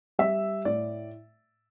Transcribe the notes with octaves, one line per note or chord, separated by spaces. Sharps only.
G3 E5
A2 D5